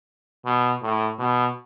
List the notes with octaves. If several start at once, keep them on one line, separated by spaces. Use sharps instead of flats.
B2
A2
B2